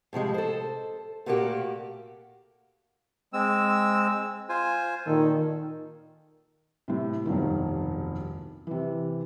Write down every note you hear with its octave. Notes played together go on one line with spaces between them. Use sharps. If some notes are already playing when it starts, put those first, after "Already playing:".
A2 C3 F3 G#3
A4 C5
A#2 A3 A#3 F#4 G4
G#3 C4 E6
F4 C5 G#5
A#2 D#3 A4
A2 C3
F1 B1 G2 D#3
C3 E3